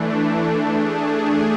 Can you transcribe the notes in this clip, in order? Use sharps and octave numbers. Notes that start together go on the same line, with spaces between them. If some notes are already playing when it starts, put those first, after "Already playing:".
Already playing: E3 A3 D4
A3 D4 G#4